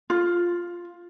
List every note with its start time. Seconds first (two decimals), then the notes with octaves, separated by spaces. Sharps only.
0.10 F4